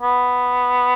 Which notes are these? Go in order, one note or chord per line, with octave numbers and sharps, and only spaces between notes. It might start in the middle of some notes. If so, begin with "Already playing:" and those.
B3